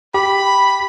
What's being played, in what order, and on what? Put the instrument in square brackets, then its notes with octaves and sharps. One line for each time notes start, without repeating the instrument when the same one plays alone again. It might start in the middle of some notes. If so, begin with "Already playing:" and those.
[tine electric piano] G4 [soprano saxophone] B5